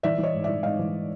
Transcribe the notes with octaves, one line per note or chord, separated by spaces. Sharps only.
E3 D5 E5
E3
C#5 D#5
G#2
E3 D5 E5
G#2 D#5 F5
E3